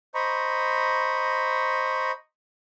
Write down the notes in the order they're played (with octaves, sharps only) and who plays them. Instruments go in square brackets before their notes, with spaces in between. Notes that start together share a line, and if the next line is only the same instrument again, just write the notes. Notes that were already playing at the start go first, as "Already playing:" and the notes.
[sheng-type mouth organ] C5 D#5 A#5 B5 C#6